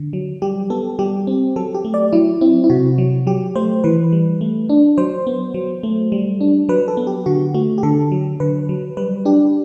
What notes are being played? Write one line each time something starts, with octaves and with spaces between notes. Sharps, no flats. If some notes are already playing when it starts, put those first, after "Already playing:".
Already playing: D3
F#3
G3 G4
B3 A4
G3 G4
C4
F#3 A4
G4
A3
D5
F#3 E4
C4 E4
E4
C3 F#4
F#3
F#3 G4
A3 C5
E3 B4
G3
A3
D4
F#3 C5
B3
F#3
A3
G3
D4
F#3 B4
A4
B3
G4
D3 F#4
A3 F#4
G4
D3 A4
F#3
D3 B4
F#3
G3 B4
D4 G4